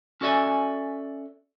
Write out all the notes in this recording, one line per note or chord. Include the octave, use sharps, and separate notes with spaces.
C#4 F#4 A4 D5 E5 G#5